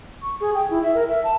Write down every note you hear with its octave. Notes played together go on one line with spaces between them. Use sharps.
C#6
G#4
G5
E4
E5
A#4
E5
A5